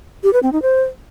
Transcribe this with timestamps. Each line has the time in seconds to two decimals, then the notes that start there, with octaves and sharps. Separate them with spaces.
0.23 G4
0.33 B4
0.43 C4
0.53 D#4
0.62 C5